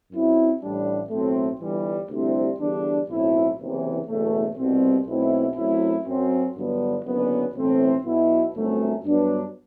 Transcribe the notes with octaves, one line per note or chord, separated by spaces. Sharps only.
F#2 F#3 C4 E4
A1 A2 G3 D4
B1 A2 F#3 A3 C4
G1 G2 E3 G3
D2 C3 G3 C4 E4
E2 D3 G3 D4
B1 A2 F#3 C4 E4
F#1 E2 C3 E3
F#1 E2 B2 A3
C2 B2 G3 C4
B1 B2 A3 C4 E4
F#2 F#3 A3 C4 E4
F#2 F#3 C4
G1 G2 D3 F#3 B3
F#1 F#2 D3 F#3 B3
B1 A2 E3 A3 C4
B1 B2 F#3 B3 E4
G1 F#2 F#3 A3 C4
G2 F#3 B3 D4